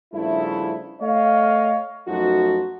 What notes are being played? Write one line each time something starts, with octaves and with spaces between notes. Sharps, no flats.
G2 C#3 F3 A3 E4
A3 C#5 D#5 F5
F#2 F3 A3 D#4 F#4